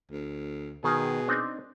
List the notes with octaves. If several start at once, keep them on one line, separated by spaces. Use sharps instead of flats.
D2
B2 D#3 D#4 G#4
C4 D4 D#4